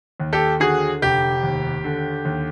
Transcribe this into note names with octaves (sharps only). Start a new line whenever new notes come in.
D#2
G4 A4
D3 F#4 G#4
F1 G4
D#2
D3
D#2